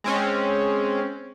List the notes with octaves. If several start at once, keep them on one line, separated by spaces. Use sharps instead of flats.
G#3 C4 C#4